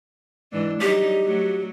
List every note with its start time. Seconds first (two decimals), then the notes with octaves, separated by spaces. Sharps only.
0.52 G#2 E3 D4
0.81 F#3 G3 D#4 G4
1.23 F#3 A3 F#4